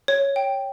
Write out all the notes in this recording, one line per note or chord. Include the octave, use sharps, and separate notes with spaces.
C#5
G5